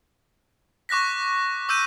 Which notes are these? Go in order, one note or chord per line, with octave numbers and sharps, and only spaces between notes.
C#6 D6 F#6 A#6 B6
D6 E6 G6 D#7